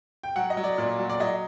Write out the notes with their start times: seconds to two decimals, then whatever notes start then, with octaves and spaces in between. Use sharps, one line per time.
0.23 G5
0.36 F#3 F#5
0.50 D#5
0.57 F#3
0.64 D5
0.78 A#2 D5
0.99 F#3
1.10 D5
1.20 F#3 D#5